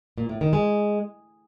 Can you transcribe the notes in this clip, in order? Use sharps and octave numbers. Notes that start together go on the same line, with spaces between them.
A#2
A2
D#3
G#3